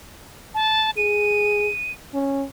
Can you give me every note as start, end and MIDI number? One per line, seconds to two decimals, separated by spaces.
0.54 0.91 81
0.97 1.70 68
0.97 1.92 99
2.14 2.45 61